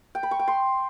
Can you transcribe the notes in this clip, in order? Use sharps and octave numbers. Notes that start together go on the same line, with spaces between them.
G5
B5
C#6
G5
C6